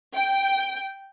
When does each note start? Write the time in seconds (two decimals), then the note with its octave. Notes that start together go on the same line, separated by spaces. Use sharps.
0.15 G5